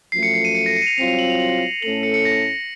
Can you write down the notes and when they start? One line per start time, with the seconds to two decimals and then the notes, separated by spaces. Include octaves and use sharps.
0.12 F#2 F3 A3 C7
0.23 C#7
0.34 C7
0.45 D#7
0.55 C#7
0.66 A#6
0.77 C#7
0.82 D#7
0.87 F7
0.97 C2 C3 F#3 C4 F4 F7
1.08 F7
1.19 F#7
1.30 F7
1.40 F#7
1.82 A2 A3 C#4 A4 F#7
2.03 C#7
2.14 C#7
2.25 A#6